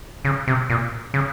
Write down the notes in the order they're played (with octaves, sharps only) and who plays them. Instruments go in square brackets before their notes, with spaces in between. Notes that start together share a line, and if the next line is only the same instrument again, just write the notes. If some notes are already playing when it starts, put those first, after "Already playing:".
[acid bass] C#3
C3
A#2
C#3